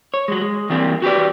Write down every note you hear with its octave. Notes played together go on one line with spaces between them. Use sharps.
C#5
F#3 G#3
G#3
E3 G3 A#3 C4
F#4 G4 B4 D5